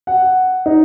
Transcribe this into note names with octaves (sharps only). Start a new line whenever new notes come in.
F#5
D#4